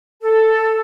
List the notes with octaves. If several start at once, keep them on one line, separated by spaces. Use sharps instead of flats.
A4